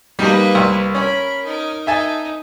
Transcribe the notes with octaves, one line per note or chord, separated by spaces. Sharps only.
G3 A#3 D#4 B4
C2
C#4 A#4 B5
D#4 A#4
D#4 E5 G#5 A5